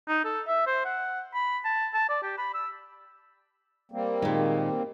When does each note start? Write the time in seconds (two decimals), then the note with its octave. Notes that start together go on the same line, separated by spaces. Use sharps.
0.08 D#4
0.24 A4
0.47 E5
0.67 C5
0.85 F#5
1.34 B5
1.65 A5
1.94 A5
2.09 D5
2.23 G4
2.38 B5
2.54 E6
3.92 G3 A#3 C4
4.22 A#2 D#3 G#3